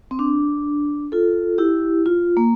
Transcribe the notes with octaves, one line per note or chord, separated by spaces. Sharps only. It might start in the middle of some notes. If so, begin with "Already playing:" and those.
C4
D4
F4 A4
E4 G4
F4
A#3